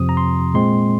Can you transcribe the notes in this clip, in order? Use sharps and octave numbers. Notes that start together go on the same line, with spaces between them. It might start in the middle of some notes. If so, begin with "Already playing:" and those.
Already playing: F2 C3 F3 C4 D#6
A#5
C6
A#2 G#3 C4 C6